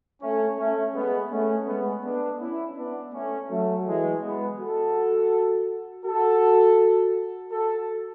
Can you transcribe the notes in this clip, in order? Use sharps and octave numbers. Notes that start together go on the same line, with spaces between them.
A3 C#4
A3 C#4
G#3 B3
A3 C#4
G#3 B3
B3 D4
C#4 E4
B3 D4
A3 C#4
F#3 A3
E3 G#3
G#3 B3
F#4 A4
F#4 A4
F#4 A4